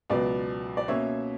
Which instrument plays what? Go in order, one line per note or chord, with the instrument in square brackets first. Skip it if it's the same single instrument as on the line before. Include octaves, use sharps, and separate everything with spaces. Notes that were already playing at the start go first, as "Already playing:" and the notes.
[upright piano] C#2 B2 F#3 B3 B4 D5
D5
B2 A#3 C#4 C#5 E5